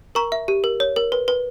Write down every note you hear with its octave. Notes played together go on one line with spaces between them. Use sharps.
A#4 A#5 C#6
E5
G4
A#4
C#5
A#4
B4
B4